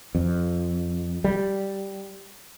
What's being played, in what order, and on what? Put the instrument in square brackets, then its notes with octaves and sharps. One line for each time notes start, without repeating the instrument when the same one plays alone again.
[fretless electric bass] F2
G3